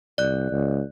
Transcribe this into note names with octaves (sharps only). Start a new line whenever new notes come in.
C2 D5 F#6
C#2